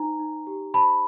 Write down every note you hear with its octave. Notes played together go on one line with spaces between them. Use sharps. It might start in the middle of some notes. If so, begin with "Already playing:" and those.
Already playing: D#4 C5 G#5 A#5
D#4
G4
C5 A5 B5